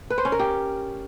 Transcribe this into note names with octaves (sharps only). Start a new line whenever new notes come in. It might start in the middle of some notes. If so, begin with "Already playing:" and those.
B4
C5
C#4
A#4
G4